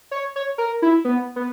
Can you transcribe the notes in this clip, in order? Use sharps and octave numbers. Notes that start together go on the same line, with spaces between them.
C#5
C#5
A#4
E4
B3
B3